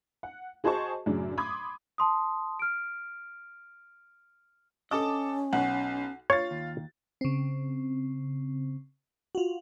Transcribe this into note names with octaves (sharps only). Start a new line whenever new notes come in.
F#5
F#4 G#4 C5 D#5 A5 C#6
F#2 A2 C#3 F#3 D4
B5 C6 D6 D#6 G#6
A5 C6 D#6
F6 D7
C#4 A4 D#5 A5 D6
B1 F#5
F4 C#5 A6
D#2
C#3 C4
F4 F#4